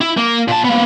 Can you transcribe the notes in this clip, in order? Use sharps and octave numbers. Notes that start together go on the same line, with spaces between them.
E4
A#3
A#2 A5
A#3 B3